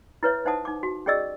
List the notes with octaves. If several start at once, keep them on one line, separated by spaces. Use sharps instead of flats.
E4 B4 C#5 E5
D#4 C5 E5 F#5 A5 D#6
D#4 D6
F#4
C#4 G4 G#4 D5 D#5 E6